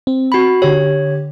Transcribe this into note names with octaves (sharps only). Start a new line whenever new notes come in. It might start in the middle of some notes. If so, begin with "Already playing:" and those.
C4
F#4 B5
D3 G4 C#5